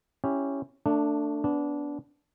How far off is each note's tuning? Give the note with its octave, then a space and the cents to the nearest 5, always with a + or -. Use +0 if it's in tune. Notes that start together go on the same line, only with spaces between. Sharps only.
C#4 +0 E4 +0 G4 +0
A3 +25 D4 +0
B3 +0 D4 -20